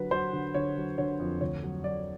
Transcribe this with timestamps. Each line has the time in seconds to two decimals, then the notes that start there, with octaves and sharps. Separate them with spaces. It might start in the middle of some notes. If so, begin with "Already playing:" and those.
Already playing: D3 F#3 B4
0.11 F#3 C5
0.33 D3
0.55 D3 C#5
0.77 F#3
0.98 D3 C#5
1.20 F2
1.41 D2 C#5
1.63 F#3
1.84 F#3 D5